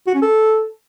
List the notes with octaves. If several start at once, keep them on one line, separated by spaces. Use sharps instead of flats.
F#4
C#4
A4